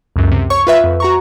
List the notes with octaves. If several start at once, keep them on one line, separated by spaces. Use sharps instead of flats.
C#2 F#2
C3
C#5 C#6
F4 B4 E5
F2
F#4 A#5 C#6